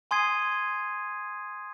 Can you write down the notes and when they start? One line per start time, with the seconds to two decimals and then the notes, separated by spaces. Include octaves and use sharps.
0.11 G#5 C6 D#6 G#6 C7 D#7